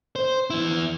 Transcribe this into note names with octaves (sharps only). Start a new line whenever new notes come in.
C5
E2 E4